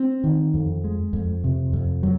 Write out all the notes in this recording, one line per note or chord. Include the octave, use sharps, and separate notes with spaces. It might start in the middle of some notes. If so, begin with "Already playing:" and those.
Already playing: C4
D#3
F2
G#3
F2
C3
F2
F#3